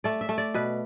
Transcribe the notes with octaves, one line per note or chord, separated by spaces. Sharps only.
A3 D5
E5
A3
D5
B2 B4